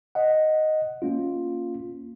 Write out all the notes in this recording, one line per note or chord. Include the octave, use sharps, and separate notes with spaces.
D#5 F#5
A#3 C#4 F4